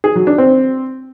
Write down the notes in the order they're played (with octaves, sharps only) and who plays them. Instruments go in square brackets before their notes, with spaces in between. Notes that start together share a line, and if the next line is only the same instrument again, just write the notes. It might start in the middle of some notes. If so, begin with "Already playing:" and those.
[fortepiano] G#4
F#3
D4
C4